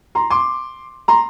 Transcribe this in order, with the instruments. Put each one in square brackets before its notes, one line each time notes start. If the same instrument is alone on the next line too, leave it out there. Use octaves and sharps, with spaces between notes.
[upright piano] A#5 C6
C6 D6
A#5 C6